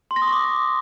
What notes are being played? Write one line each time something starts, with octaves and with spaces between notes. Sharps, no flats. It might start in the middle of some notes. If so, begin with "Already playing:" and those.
C6
A#6
D#6
C#6
D6